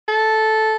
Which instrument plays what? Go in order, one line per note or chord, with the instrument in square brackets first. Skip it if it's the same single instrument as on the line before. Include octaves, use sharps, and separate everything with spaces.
[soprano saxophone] A4